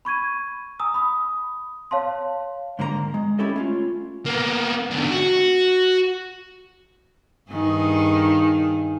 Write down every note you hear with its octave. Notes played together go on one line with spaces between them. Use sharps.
B5 C#6 G#6 D#7
G#5 A#5 D#6 E6
B5 D#6
C#5 F5 A5 C6
G#2 D3 A#3 A#4 A#5
G#3
C#4 E4 G4 A4 D#5
A3 C#4 F4
A#3 B3
E2 D3
F#4
G2 D#3 G#4